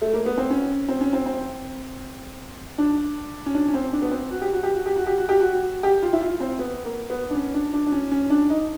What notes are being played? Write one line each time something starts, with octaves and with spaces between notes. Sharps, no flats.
A3
A#3
B3
C4
C#4
C4
C#4
C4
C4
D4
C#4
D4
C#4
C4
D4
B3
C4
F#4
G4
F#4
G4
F#4
G4
F#4
G4
F#4
G4
F#4
G4
F4
E4
F4
C4
B3
A#3
B3
D4
C#4
D4
D4
D4
C#4
C#4
D4
D#4